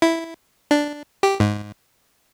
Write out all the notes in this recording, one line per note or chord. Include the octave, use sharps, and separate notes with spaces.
E4
D4
G4
G#2